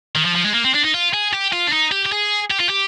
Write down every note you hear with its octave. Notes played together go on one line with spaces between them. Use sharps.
D#3
F3
F3
G#3
A#3
C4
D4
D#4
F4
G#4
G4
F4
D4
D#4
G4
G4
G#4
G4
F4
G4